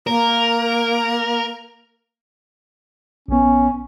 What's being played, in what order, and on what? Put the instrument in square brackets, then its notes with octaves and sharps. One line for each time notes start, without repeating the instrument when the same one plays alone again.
[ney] A#3 [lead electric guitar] A#4
[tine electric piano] A#1 B3 [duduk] C#4